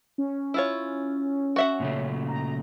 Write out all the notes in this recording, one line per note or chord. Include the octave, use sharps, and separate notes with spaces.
C#4
E4 F4 C#5
F#4 E5 F#5
A#2 C#3 A3
A#5